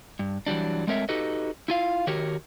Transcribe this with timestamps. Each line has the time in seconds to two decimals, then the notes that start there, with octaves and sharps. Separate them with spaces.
0.19 G2
0.47 E3 F#3 G3 D4
0.87 G#3 A3 C4 A#4 C#5 E5
1.09 D#4 F#4 G4 A4 B4 D#5
1.68 E4 F4 F5
2.07 D#3 F#4 G4 A#4 C#5